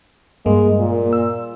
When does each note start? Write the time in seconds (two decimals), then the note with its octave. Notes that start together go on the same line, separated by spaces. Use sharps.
0.46 G2 G#3 A#3
0.79 A#2
1.13 E6